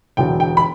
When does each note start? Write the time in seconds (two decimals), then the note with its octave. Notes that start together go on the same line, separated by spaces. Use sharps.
0.17 E1 E2 D3 F#3 G5
0.40 G5
0.57 B5